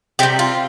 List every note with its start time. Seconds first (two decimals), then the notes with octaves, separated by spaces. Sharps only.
0.19 C3 G3 G4
0.39 F4